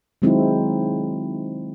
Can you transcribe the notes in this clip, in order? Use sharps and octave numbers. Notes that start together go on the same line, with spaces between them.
D#3 F#3 G#3 C4 D#4 E4